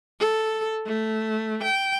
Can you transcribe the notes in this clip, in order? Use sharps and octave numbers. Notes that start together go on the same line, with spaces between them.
A4
A3
G5